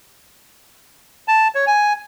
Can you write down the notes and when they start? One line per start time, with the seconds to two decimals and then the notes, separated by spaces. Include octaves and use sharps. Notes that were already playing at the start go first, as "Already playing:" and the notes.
1.28 A5
1.55 C#5
1.67 G#5